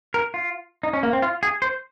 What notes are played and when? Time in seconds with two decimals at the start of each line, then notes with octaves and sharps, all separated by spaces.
0.14 A#4
0.34 F4
0.83 D#4
0.93 C#4
1.03 A#3
1.13 C4
1.22 F4
1.43 G#4
1.62 C5